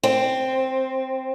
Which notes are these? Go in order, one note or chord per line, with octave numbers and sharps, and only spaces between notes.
C4